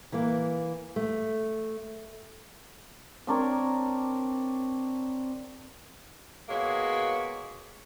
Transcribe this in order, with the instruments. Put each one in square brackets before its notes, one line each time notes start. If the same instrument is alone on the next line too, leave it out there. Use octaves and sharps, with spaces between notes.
[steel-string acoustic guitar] E3 A#3
A3
[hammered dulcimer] C4 D4 A#4 C#5
[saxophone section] B2 G#3 A#3 C#5